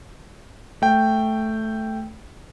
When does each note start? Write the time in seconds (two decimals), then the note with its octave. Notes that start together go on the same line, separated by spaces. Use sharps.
0.82 A3 G5